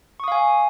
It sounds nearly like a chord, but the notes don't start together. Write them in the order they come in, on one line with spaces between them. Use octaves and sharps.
C#6 D#6 F5 G#5